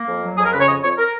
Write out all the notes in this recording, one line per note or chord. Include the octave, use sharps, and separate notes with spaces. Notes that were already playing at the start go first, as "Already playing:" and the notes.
Already playing: A#3
F2
F#3
F2 G#4
A#4
C#3 B4
C#5
F2 D#5
F2 C#5
A#4